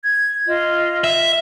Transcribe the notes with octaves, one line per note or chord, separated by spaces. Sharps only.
G#6
F4 D#5
E5